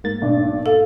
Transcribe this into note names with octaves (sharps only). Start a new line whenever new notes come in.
G#2 A#3 A6
B1 D4
A4 F5